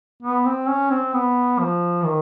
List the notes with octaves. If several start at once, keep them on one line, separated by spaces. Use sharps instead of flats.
B3
C4
C#4
C4
B3
F3
D#3